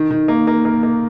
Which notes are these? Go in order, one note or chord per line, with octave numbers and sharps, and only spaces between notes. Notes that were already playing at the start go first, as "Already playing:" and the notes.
Already playing: D#3
D#3
A#3
A#3
A#3
A#3